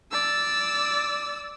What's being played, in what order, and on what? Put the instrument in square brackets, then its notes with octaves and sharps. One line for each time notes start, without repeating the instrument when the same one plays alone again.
[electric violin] D5 E6